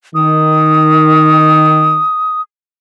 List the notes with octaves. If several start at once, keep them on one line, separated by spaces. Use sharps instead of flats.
D#3 D#6